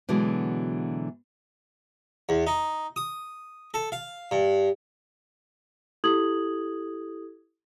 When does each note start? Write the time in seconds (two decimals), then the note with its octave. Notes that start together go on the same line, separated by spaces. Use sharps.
0.09 B2 D3 E3 F#3 G#3
2.29 E2
2.47 D#4
2.96 D#6
3.74 A4
3.92 F5
4.31 G2
6.04 E4 G4 A4 D#6 G#6 F#7